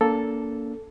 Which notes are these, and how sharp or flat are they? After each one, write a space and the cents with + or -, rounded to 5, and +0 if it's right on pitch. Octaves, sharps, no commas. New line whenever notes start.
A#3 +0 D4 -45 A4 +0